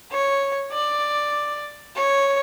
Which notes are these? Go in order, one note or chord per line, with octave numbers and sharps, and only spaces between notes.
C#5
D5
C#5